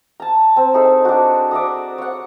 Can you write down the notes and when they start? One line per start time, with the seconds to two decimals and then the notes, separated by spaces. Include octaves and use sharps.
0.20 A5 A#5
0.56 C4
0.74 D#4 E4 G#4 A4
1.05 D4 F#4
1.51 D5 E5 A#5 D#6
1.98 C#5 F#5